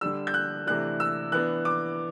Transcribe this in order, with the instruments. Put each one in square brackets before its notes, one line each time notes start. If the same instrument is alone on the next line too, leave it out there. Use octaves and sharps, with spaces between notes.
[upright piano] D3 G3 D4 E6
G6
F#6
C3 E3 A3 D4 F#6
E6
E3 B3 D4 F#6
D6